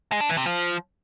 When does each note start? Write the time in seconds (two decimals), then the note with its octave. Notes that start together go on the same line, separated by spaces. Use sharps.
0.12 G#3
0.21 D4
0.29 E3
0.37 C3
0.46 F3